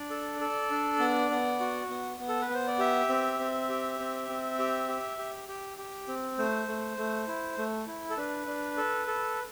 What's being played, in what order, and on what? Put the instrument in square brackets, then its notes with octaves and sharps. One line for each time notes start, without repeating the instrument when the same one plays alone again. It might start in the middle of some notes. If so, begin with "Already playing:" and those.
Already playing: [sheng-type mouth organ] D4 D5
A4
A4
D4
B3
B3
F#4
B3
B3
A4
B4
B3 C5
D5
G4 E5
C4
C4
G4
C4
C4
G4
G4
G4
G4
G4
C4
A3 C5
A3
A3
E4
A3
E4
A4
D4 B4
D4
A4
A4